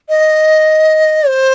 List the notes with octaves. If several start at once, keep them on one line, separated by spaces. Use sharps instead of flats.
D#5
C5